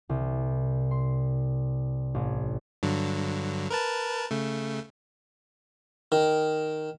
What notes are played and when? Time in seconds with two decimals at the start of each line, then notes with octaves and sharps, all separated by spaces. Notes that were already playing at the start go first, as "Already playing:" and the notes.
0.09 C2
0.91 C6
2.14 A1
2.83 G2 D3 F#3
3.70 A#4 B4 A5
4.31 C#3 A3
6.12 D#3